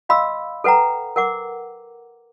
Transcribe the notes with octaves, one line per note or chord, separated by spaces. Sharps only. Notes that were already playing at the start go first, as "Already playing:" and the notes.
D#5 F5 B5 C6 E6
A4 B4 F#5 G5 A#5
A#4 F#5 D6